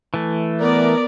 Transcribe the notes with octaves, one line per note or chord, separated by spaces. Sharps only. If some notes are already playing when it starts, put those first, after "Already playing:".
E3 A3
B3 A#4 D5